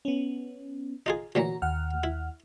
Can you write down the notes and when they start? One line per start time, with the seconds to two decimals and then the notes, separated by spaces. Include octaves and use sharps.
0.05 B3 C#4
1.06 D#4 F4 G#4
1.35 A#2 E3 F#3 F#4 A#5
1.62 D#2 F#5 F6
2.03 E4